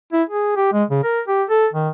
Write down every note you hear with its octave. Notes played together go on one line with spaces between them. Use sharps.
E4
G#4
G4
G#3
C#3
A#4
G4
A4
D#3